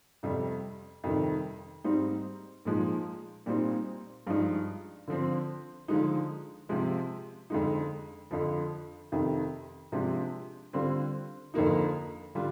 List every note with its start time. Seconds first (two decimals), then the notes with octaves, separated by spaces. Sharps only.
0.23 F2 C3 G3
1.04 F2 C3 D#3 G3
1.84 G#2 G3 C4 D#4
2.65 A#2 F3 G#3 D#4
3.46 A#2 G3 C4 D#4
4.27 G2 F3 G#3 D#4
5.08 D3 F3 C4
5.88 D3 F3 G#3 D#4
6.69 C3 F3 G#3
7.50 F2 D3 G#3 D#4
8.31 F2 D3 F3
9.12 F2 C3 D#3
9.92 C3 F3 G#3 D4
10.73 D3 G3 C4 F4
11.54 F2 D3 F3 A#3 D#4
12.35 D3 G3 D4 F4